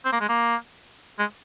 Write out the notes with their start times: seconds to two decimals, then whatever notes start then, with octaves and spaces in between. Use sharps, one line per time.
0.05 C4
0.12 A#3
0.21 G#3
0.29 A#3
1.19 G#3